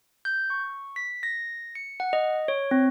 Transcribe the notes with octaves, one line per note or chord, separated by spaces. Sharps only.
G6
C#6
B6
A#6
C#7
F#5
D#5
C#5
C4